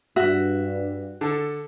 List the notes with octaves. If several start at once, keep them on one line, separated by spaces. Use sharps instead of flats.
G2 F#4 E5
D3 A4